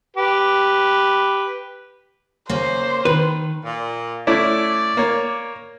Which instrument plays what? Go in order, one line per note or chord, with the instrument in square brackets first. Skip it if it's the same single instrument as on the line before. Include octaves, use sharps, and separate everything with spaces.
[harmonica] G4 B4
[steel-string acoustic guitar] C#3 A#3 [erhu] C5
[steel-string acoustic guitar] D#3 [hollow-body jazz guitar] B4
[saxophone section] A#2
[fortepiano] A3 C#4 E4 [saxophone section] D5
[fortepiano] A#3 C#5